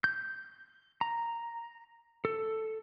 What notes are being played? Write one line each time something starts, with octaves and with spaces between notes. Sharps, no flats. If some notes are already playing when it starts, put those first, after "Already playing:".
G6
A#5
A4